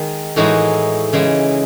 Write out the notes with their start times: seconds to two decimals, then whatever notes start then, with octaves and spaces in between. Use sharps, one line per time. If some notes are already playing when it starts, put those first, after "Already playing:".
Already playing: D#3 G#3
0.36 A2 E3 G#3 D#4 F#4
1.13 C#3 E3 G#3